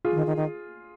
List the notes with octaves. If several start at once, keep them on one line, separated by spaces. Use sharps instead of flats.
F4 G#4
F3
D#3
D#3
D#3